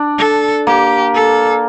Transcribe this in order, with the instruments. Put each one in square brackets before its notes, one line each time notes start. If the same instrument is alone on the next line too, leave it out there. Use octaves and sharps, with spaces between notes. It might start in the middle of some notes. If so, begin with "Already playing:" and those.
Already playing: [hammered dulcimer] D4
[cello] A4
[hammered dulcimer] A#3 [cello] G4
[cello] A4